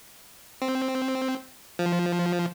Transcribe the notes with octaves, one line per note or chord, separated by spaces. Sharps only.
C4
F3